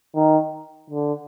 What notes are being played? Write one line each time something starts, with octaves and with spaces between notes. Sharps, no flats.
D#3
D3